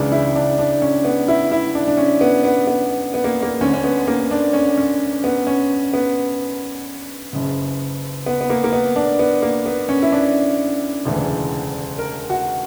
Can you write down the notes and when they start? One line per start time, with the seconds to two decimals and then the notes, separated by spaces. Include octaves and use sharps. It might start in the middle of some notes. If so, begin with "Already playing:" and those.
Already playing: C#2 C#3 E3 D4
0.12 E4
0.36 D4
0.59 D4
0.82 C#4
1.05 B3
1.28 E4
1.51 E4
1.75 D4
1.88 D4
1.97 C#4
2.21 B3
2.44 B3
2.67 B3
3.14 B3
3.24 A#3
3.43 A#3
3.61 D2 D3 C#4
3.74 C#4
3.84 B3
4.07 A#3
4.31 D4
4.53 C#4
4.78 C#4
5.24 B3
5.47 C#4
5.94 B3
7.33 F#1 F#2 C#3
8.26 B3
8.41 B3
8.50 A#3
8.64 A#3
8.73 B3
8.96 D4
9.19 B3
9.42 A#3
9.66 B3
9.89 C#4
10.03 E4
10.12 D4
11.05 E1 D2 C#3 E3
11.98 A#4
12.30 F#4